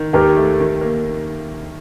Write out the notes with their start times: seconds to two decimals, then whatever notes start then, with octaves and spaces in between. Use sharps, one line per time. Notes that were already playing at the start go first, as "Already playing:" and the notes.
Already playing: D#3
0.13 D#2 G4 A#4
0.37 A3
0.60 D#3
0.81 A#3